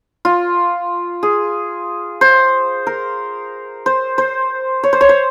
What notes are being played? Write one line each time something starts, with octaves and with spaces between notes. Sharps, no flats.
F4
G#4
C5
A#4
C5
C5
C#5
C5
C#5
C5